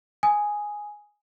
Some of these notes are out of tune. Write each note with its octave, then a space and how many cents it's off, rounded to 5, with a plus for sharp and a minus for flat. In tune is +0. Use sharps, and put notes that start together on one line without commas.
G#5 +0 D#6 +0